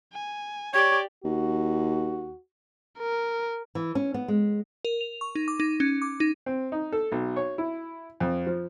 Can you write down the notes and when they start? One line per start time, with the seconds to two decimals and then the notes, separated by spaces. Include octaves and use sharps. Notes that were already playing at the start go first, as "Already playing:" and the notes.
0.12 G#5
0.74 G4 C#5 D5 G#6
1.24 D#2 F#4
2.98 A#4
3.75 E3
3.95 C#4
4.14 B3
4.28 G#3
4.85 A#4
5.01 F7
5.21 C#6
5.35 D#4
5.48 D6
5.60 D#4
5.80 C#4
6.02 D6
6.20 D#4
6.46 C4
6.72 D#4
6.92 A4
7.12 B1
7.36 C#5
7.58 E4
8.20 F2
8.46 F3